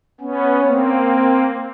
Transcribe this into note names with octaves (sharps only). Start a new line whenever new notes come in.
B3 C#4
A#3 C4